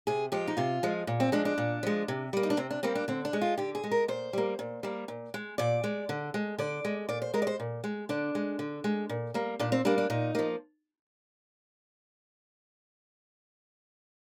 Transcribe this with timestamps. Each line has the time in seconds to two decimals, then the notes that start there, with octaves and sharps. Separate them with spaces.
0.07 C3 G#4
0.32 F3 G#3 G4
0.48 D#4
0.57 C3 F4
0.83 F3 G#3
1.07 A#2
1.20 C4
1.32 F3 G#3 D4
1.45 D4
1.58 A#2
1.83 F3 G#3
2.08 C3
2.33 G3 A#3
2.43 D#4
2.50 D4
2.57 C3 C4
2.71 D4
2.83 G3 A#3 C4
2.95 D4
3.08 D3 C4
3.25 D4
3.33 G#3
3.42 F4
3.58 D3 G4
3.75 G#4
3.84 G#3
3.91 A#4
4.08 A#2 C5
4.33 G3 A#3
4.59 A#2
4.83 G3 A#3
5.08 A#2
5.34 G#3
5.58 A#2 D5
5.84 G#3
6.09 D3
6.34 G#3
6.59 D3 D5
6.85 G#3
7.09 A#2 D5
7.22 C5
7.34 G#3 A#4
7.42 D5
7.47 C5
7.60 A#2
7.84 G#3
8.09 D3 D4
8.35 G#3
8.59 D3
8.84 G#3
9.09 A#2
9.34 G3 A#3
9.59 A#2 D4
9.72 C4
9.85 G3 A#3 D4
9.98 D4
10.10 A#2 D#4
10.35 F3 A#3